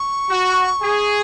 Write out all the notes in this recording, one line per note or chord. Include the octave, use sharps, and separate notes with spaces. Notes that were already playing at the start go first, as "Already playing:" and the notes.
Already playing: C#6
F#4
G#4